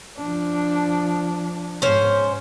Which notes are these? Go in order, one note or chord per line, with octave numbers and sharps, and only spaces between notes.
F3 D4
G#2 C#4 C5